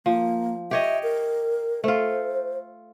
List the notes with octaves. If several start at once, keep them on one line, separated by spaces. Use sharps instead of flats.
F3 A#3
G4 C#5 D#5 E5
A#4
A3 F4 C5